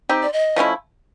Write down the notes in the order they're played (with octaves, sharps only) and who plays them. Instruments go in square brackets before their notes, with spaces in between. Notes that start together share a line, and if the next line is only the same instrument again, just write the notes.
[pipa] C4 D#4 G4
[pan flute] D5
D#5
[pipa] F3 A3 C#4 E4